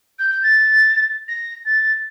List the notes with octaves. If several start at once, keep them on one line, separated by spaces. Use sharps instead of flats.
G6
G6
A6
A#6
A6